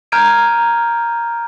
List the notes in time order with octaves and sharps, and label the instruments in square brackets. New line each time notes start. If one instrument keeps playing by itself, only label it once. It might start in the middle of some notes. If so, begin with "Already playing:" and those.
[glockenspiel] A#5 F6 G6 G#6 D7 D#7